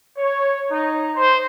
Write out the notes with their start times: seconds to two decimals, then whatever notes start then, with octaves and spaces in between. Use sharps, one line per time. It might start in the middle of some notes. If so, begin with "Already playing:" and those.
0.18 C#5
0.70 D#4
1.16 C5